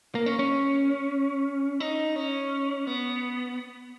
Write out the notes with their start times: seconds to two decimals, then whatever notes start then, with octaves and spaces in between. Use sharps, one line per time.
0.15 A#3
0.26 C#4
0.39 C#4
1.80 D#4
2.16 C#4
2.87 B3